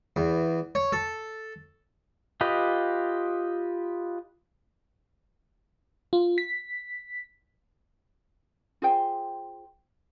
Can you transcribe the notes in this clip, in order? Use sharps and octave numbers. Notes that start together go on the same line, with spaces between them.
E2
C#5
A4
F4 G4 B4 D#5
F4
B6
F4 G#4 C5 G5